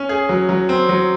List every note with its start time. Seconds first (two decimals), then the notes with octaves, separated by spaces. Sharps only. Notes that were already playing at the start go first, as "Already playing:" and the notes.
Already playing: C#4
0.09 G#4
0.29 F#3
0.49 F#3
0.69 C4
0.89 F#3